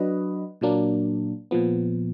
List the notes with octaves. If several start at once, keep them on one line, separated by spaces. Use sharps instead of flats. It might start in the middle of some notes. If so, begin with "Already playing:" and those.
Already playing: F#3 D4 F#4 B4 D#5
A#2 F#3 A#3 D4
A#2 F3 B3